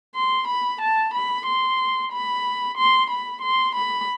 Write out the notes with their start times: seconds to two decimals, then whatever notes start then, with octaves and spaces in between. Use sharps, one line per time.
0.15 C6
0.48 B5
0.82 A5
1.14 B5
1.46 C6
2.12 B5
2.78 C6
3.10 B5
3.42 C6
3.76 B5